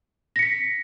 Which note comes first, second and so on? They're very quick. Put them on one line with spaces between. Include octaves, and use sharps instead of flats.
A#6 C#7 B6